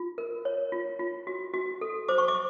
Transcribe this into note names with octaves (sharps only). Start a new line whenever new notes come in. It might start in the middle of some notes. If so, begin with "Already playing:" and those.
Already playing: F4
A#4
C#5
F4
F4
F#4
F#4
A4
C5 D6
C#6
D6